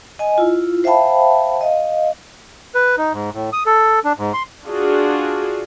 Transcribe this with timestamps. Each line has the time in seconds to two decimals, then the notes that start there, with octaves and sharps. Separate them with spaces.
0.19 D#5 G#5
0.38 E4 F4
0.84 C5 E5 F5 G5 A5 B5
1.61 D#5 F5
2.75 B4
2.97 D#4
3.13 G#2
3.34 A2
3.53 D#6
3.66 A4
4.04 D4
4.18 G#2
4.34 C6
4.66 D4 F4 F#4 G#4